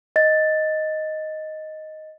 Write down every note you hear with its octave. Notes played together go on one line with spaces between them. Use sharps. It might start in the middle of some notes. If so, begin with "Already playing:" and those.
D#5 A6